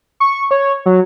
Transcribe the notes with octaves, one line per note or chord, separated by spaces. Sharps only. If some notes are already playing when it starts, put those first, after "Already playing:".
C#6
C#5
F#3